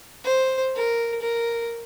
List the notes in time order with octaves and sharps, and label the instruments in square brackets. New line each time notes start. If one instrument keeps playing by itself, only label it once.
[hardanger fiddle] C5
A#4
A#4